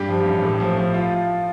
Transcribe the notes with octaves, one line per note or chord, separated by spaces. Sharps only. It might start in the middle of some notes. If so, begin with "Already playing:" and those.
Already playing: G2 G4
F3
A1
A2
F3
F3
F4